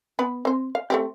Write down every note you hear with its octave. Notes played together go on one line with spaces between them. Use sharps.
B3 B4
C4 C5
F5
A3 C4 G4